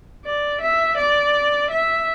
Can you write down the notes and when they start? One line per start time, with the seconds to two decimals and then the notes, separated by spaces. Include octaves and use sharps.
0.25 D5
0.61 E5
0.97 D5
1.70 E5